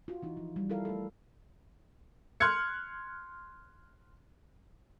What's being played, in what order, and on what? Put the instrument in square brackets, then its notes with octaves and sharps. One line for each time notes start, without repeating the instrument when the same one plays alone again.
[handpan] F4 F#4
E3 D#4 E4
F3
G3
E4 F4 A4 A#4 F5
A3 A4
[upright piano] C6 F6 F#6 G#6 C#7